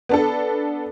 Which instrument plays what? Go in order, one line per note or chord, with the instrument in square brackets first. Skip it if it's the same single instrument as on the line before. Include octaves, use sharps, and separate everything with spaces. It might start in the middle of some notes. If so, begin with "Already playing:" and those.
[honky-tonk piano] B3 D4 A4